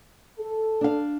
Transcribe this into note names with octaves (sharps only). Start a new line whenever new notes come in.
A4
D4 F5